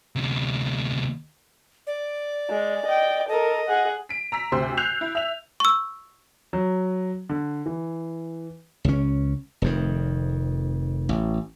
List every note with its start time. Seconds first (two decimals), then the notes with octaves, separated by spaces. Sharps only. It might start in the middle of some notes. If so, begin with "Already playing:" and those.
0.16 D2 C3
1.87 D5
2.50 G#3
2.85 D#5 G5
3.28 A4 A#4 D#5
3.68 G#4 F#5
4.09 B6 D7
4.32 A#5 E6 B6
4.52 D2 C3 G4 C5 C6 E6
4.77 E6 F#6 G6 C7 F7
5.01 E4
5.15 E5 F7
5.60 C#6 E6
6.53 F#3
7.29 D3
7.66 E3
8.85 C#2 C#4
9.62 F1 F2 D#3
11.09 A1